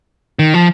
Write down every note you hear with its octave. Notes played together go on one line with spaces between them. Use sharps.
D#3
F3